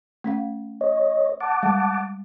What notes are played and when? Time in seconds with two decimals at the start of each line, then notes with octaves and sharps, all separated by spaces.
0.24 A3 C#4 F5
0.81 C#5 D#5
1.40 F#5 A5 D6
1.63 G3 G#3